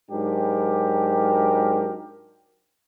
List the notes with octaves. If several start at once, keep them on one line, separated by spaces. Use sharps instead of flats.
G#2 F#3 D4 G4 A#4